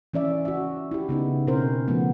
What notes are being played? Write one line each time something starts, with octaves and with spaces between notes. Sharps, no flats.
E3 C#4 D5 E5
F#4 E5
E4 G4
C#3 B3 D#4
B2 C4 C#4 E4 A#4 C5
C#3 F3 A3 B3